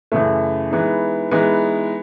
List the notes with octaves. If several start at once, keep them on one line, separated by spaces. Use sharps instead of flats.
F#2 C#3 E3 A3
E3 G#3 B3 D#4
E3 G#3 B3 D#4